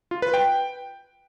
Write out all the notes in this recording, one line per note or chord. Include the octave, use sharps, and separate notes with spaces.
F4
B4
G5